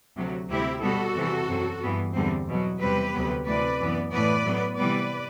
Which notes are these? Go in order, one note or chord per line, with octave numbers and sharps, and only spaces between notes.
D2 C3 F#3
D2 C3 G3 C4 E4 G4
B2 G3 B3 F#4 A4
E2 C3 E3
F#2 F#3 C4
G2 E3 B3
E2 D3 G3 C4
E2 B2 F#3
E2 C3 G3 C4 G4 B4
D2 C3 F#3 B3
D2 C3 E3 A3 B4 D5
F#2 E3 B3
A2 E3 B3 B4 D5
A2 F#3 B3
C3 E3 G3 B3 B4 D5